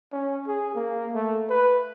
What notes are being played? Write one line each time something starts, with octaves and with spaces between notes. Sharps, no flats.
C#4
G#4
A#3
A3
B4